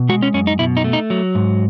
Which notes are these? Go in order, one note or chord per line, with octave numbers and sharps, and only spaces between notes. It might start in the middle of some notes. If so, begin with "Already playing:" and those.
Already playing: B2
G#3 F#4
C#4
F#2 C#4
D#4
B2 E4
D#4
A3
D#4
F#3
G#2